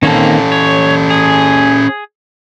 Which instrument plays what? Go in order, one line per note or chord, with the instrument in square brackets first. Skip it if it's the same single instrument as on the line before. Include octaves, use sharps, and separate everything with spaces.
[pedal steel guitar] D#3 A#3 C4 [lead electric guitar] C#4 A4
[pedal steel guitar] C#5
G#4